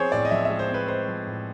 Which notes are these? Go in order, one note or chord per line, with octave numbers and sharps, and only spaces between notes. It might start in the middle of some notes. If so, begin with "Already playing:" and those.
Already playing: F3 C4 G#4 C5 C#5
A2 D5
D#5
F3 E5
G#3 E5
C5
C4 B4
G#3 C5
F3
A2